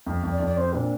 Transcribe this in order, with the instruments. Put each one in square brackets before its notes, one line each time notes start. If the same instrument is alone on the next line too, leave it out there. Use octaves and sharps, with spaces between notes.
[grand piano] F2
F2
[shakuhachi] D5
[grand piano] F2
[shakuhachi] D5
[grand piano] C4 [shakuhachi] C5
[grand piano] A#2 [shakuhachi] D4